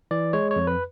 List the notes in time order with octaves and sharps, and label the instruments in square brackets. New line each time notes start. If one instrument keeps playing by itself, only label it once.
[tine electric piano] E3 D5
G#3 C#5
C#5
F2
B4